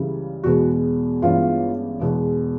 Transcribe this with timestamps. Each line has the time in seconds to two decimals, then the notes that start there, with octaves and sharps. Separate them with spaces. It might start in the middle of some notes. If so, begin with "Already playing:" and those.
Already playing: C#2 C#3 E3 G3
0.43 E2 B2 G#3 B3 F#4
1.22 A1 G2 E3 G#3 B3 F4
2.00 E2 B2 G#3